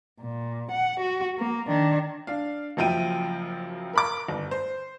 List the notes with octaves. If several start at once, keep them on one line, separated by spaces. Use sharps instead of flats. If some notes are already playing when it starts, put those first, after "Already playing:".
A#2
F#5
F#4
A#3
D#3 D4
D4 F5
F#1 F#2 F3 E5 G5 D#7
A#4 B5 D6
G1
C5